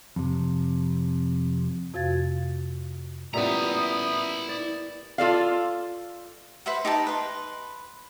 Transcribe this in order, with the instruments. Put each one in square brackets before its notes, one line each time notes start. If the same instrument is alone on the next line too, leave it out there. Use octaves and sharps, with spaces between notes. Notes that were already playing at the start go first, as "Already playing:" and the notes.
[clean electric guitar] F2 C3
[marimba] F2 C3 F#4 F5 G#6 A6
[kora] A#2 G3 B3 [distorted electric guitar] E4 A#5 [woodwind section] E5 B5 D#6
[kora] D5
[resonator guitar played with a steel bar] F4 A4 D5 F5
[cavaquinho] B4 C5 E5 F#5
D#4 G4 B4 A5
B4 C6